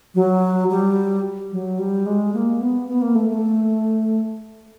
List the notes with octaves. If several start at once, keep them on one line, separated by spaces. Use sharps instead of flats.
F#3
G3
F#3
G3
G#3
A#3
B3
B3
A#3
A3
A3